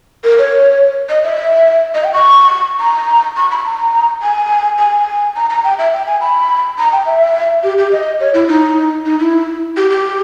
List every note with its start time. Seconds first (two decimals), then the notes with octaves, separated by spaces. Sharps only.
0.24 A#4
0.38 C#5
1.09 D#5
1.24 E5
1.95 D#5
2.04 G5
2.14 C#6
2.80 A#5
3.37 C#6
3.51 B5
3.65 A#5
4.22 G#5
4.79 G#5
5.36 A#5
5.50 A#5
5.64 G5
5.79 E5
5.93 G5
6.07 G#5
6.21 B5
6.78 A#5
6.92 G5
7.06 E5
7.64 G4
7.78 G4
7.92 D#5
8.20 C#5
8.34 E4
8.48 D#4
9.06 D#4
9.20 E4
9.77 G4
9.90 G4